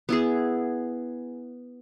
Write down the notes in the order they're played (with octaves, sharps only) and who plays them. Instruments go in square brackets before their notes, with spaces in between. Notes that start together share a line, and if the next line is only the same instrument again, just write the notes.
[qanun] B3 E4 G#4